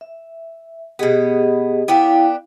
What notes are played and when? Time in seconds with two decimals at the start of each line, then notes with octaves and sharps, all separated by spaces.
0.01 E5
0.99 B2 B3 G4 G#4 D#5
1.88 B3 D4 E4 G4 F5 G5